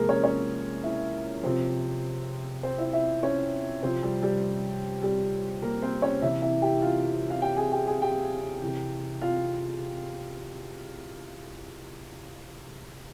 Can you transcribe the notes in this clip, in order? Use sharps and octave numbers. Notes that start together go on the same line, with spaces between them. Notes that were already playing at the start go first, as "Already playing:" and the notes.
Already playing: C3 F3 G#3 A#3 E4 F4 G#4 A#4
C#4 C#5
C#4 C#5
E4 E5
C3 F3 C4 C5
C4 C5
E4 E5
E4 E5
C#4 C#5
C3 F3 C4 C5
G3 G4
G3 G4
G3 G4
A#3 A#4
C4 C5
C#4 C#5
C3 E3 E4 E5
E4 E5
G4 G5
F4 F5
F5
G4 G5
G#4 G#5
G4 G5
G#4 G#5
G4 G5
C3 E3
F4 F5